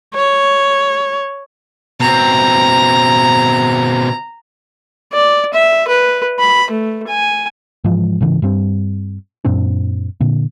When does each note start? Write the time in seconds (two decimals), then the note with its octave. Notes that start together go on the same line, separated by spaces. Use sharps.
0.15 C#5
2.00 B2 C4 A#5
5.13 D5
5.54 E5
5.88 B4
6.39 B5
6.71 A3
7.08 G#5
7.84 G#2 E3 F3 G#3
8.21 G#2 C#3 E3
8.42 G2 G3 C4
9.45 F#2 A#2 C4 D4
10.20 A#2 D3